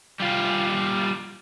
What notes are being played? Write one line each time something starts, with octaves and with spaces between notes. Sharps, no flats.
G3 F4